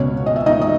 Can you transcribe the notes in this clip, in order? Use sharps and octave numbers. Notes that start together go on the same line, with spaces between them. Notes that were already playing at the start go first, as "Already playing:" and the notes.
Already playing: C#2 B2 C#4 C#5
D#5
E5
D#4 D#5
D#5